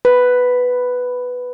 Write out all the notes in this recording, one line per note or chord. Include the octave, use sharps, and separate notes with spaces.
B4